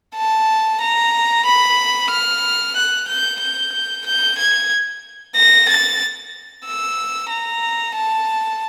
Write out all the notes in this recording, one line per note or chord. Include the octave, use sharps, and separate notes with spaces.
A5
A#5
B5
F6
F#6
G6
G6
G6
G#6
A#6
A6
E6
A#5
A5